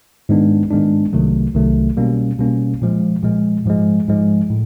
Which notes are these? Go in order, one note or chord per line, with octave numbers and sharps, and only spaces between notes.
G#2 D#3 G#3 B3 D4
G#2 D#3 G#3 B3 D4
C2 C3 D#3 F#3 A3
C2 C3 D#3 F#3 A3
B2 G3 A#3 C#4
B2 G3 A#3 C#4
A#2 F3 G#3
A#2 F3 G#3
G#2 F3 G#3
G#2 F3 G#3
A2